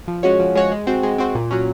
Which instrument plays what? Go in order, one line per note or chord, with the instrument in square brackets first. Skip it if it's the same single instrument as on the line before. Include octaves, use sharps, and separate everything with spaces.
[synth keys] F3
G#3 C#4 F#4 C#5
F3
G#3 C#4 F#4 C#5
G#3
C4 F#4 C5
G#3
C4 F#4 C5
A#2
F#3 C#4